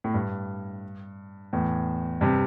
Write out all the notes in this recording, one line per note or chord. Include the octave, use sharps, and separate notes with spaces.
A2
G2
E2 A2
G2 C3